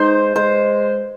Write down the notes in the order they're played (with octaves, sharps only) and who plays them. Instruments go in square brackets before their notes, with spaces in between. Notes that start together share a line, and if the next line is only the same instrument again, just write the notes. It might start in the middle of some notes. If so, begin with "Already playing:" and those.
Already playing: [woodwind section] G#3 D#4 [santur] C5
[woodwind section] G#3 [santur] C5